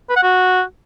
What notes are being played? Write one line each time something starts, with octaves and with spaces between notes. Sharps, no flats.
B4
F#5
F#4